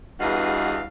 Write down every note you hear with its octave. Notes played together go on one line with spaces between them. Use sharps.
E2 G2 F#4 G#4 D#5 F5